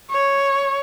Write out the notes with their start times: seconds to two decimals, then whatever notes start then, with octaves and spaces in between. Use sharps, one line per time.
0.11 C#5